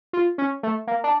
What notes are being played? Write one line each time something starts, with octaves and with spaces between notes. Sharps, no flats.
F4
C#4
A3
A#3
D4